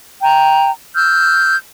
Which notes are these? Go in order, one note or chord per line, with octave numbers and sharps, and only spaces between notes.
G5 A#5
E6 F6 G6